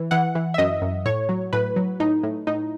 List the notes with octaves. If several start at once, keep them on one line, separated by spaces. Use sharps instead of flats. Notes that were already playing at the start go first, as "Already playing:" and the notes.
Already playing: E3
E3 F#5
E3
E5
F#2 D#5
F#2
A2 C#5
F#3
A2 B4
F#3
A2 D#4
A2
A2 D#4